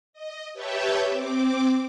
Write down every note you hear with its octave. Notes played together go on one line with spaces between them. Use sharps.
D#5
G4 B4 C#5 E5 G5 A5
C4 D6